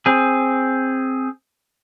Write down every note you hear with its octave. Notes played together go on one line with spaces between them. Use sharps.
C4 G#4